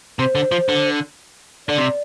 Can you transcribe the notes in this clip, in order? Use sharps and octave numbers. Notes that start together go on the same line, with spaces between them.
C3 C5
D3
F3
D3
D3 D5
C3